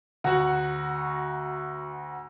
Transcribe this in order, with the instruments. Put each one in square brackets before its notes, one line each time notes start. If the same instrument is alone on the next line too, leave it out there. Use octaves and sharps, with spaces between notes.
[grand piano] D2 F#4 F#7 [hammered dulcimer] F#5 A#5